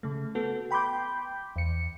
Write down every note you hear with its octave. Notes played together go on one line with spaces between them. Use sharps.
C#3 A3
B3 F#4 A4
G5 B5 C6 D6 G6
E2 C#7